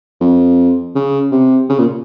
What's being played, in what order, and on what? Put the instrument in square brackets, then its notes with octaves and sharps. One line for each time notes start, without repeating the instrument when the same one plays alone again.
[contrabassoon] F2
C#3
C3
C#3
A#2